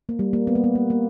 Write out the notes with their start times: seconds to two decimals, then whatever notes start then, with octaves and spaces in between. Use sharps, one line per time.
0.09 A#3
0.19 G3
0.33 A#3
0.47 B3
0.55 A#3
0.64 B3
0.75 A#3
0.90 A#3